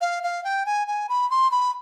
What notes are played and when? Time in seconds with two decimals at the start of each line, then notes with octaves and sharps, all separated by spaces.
0.01 F5
0.23 F5
0.44 G5
0.66 G#5
0.88 G#5
1.09 B5
1.31 C6
1.51 B5